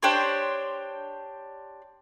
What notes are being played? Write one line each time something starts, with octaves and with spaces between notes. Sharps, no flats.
D4 G4 C5 C#5